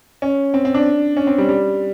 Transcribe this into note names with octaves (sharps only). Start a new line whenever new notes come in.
C#4
C4
C4
D4
C#4
C4
G3
G3